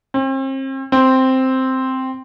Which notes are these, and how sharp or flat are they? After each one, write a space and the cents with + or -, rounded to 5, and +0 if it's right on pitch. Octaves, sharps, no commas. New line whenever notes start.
C4 +40
C4 +0